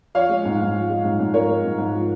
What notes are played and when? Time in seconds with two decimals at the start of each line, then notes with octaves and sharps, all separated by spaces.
0.14 F3 C#5 F5
0.29 G#3
0.45 G#2
0.60 G#2
0.74 F3
0.90 G#3
1.05 G#2
1.19 G#2
1.33 F3 A#4 C#5
1.49 G#3
1.64 G#2
1.78 G#2
1.94 F3